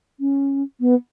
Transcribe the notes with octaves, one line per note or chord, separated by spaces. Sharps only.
C#4
B3